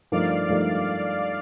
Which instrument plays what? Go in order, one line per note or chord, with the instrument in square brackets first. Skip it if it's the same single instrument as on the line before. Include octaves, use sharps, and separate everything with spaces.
[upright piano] G2 F3 A3 D#4 A#4 [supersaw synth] D5 F5
[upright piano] G2 F3 A3 D#4 A#4